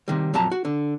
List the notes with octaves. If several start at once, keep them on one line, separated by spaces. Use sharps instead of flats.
C3 D#3 G3
F2 A#2 F#3 A5 A#5
F#4
D3